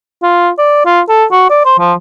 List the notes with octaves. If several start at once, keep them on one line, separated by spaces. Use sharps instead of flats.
F4
D5
F4
A4
F#4
D5
C5
F3